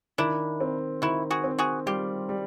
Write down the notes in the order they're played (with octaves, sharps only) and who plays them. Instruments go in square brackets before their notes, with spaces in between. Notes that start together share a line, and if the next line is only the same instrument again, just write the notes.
[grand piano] D#3 [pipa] D4 E4
[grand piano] C4
[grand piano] D#3 [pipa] E4 F#4
[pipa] F#4 G#4
[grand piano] C4
[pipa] F#4 G#4
[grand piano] G3 [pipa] F4 G4
[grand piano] G3